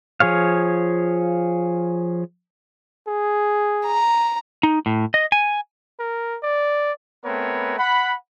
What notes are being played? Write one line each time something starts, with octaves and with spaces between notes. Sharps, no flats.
F3 G#4 C#5 F5
G#4
A#5
D#4
A2
D#5
G#5
A#4
D5
A3 B3 C4 A#4 B4 C#5
F#5 B5